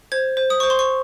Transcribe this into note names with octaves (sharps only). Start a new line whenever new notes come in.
C5 G#6
C5
D#6
C5 C#6
C6
C#6